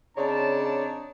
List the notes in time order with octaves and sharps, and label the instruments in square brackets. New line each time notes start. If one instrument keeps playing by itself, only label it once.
[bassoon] C#3 [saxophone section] C4 D#4 C#5 [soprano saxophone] D4 [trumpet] A5